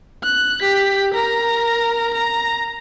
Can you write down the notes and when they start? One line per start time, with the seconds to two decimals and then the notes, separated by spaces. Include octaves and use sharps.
0.24 F#6
0.61 G4 B6
1.14 A#4 A#5
2.14 A#5